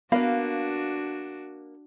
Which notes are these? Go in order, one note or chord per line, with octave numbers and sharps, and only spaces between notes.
A#3 B3 D4 F#4 B4 F5